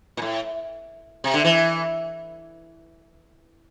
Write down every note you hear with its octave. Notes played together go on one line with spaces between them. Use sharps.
A#2
A2
C3
D3
E3